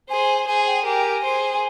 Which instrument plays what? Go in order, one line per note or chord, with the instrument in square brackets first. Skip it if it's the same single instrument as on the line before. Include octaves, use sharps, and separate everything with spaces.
[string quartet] G#4 C5 [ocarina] G#5
[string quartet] G#4 C5 [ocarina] G#5
[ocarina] G5
[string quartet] G4 A#4 [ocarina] G#5
[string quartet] G#4 C5